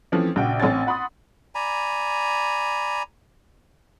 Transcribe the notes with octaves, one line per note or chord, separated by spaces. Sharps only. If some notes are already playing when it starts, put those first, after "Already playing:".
E3 F3 A3 C4 C#4
A#1 C#3 F#4 G5
A1 C4 C#5 G#5 A6
F#5 B5 C6 D#6
D5 G#5 A#5 B5